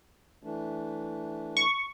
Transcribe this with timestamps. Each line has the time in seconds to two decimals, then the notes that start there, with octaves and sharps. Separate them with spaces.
0.43 E3 A3 D4
1.57 C#6